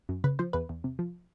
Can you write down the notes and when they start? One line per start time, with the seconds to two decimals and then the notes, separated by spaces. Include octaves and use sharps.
0.09 F#2
0.24 C#3 B4
0.39 F3 C5
0.53 E2 B4
0.69 E2
0.84 C3
0.99 F3